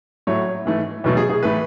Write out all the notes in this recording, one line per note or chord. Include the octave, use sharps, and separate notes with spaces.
A2 F#3 A3 C#5
G#2 E3 A3
E2 B2 F#3 A3
G#4
G#4
A2 E3 A3 B4